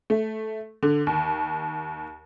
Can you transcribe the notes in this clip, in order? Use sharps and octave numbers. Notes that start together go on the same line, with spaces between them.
A3
D3
D#2